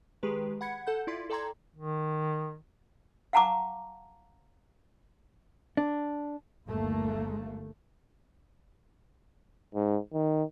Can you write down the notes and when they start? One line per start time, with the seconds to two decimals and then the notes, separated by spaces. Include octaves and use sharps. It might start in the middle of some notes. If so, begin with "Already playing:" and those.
0.23 D#3 G#3 G4 G#4 B4
0.61 F#5 B5 G#6 C#7
0.87 A4 F#5 G6
1.07 E4 F4 D5 C6
1.30 A4 D5 G5 A#5 C6 G#6
1.76 D#3
3.33 F5 F#5 A5 A#5 C#6 D6
5.77 D4
6.68 G1 D#2 A3 A#3
9.75 G#2
10.14 D#3